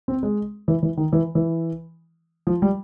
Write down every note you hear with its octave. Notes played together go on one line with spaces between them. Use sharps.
C4
G#3
E3
E3
D#3
E3
E3
F3
G3